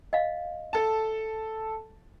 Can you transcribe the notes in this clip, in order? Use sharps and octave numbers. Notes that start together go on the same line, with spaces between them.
D#5 F5
A4 A5